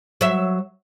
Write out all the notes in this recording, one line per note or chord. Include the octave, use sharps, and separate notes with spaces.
F#3 E5